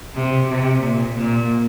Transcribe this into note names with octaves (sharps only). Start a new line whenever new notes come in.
C3
C3
A#2
A#2